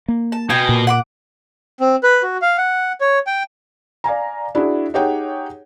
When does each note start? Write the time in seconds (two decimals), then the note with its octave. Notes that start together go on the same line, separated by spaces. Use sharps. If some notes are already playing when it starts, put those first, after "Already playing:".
0.08 A#3
0.32 A5
0.50 B2 G5 G#5
0.69 A#2
0.87 F#5 C6 D6
1.80 C4
2.03 B4
2.23 F#4
2.42 F5
2.58 F#5
3.01 C#5
3.27 G5
4.04 D5 F5 G#5 A#5
4.55 D4 E4 F#4 G#4
4.94 D#4 G4 G#4 C#5 F#5 G5